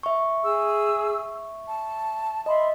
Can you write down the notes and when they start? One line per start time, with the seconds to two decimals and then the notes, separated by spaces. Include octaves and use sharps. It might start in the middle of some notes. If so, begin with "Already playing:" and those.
0.03 E5 C#6
0.43 G#4 E6
1.68 A5
2.46 D#5 E5 B5 C6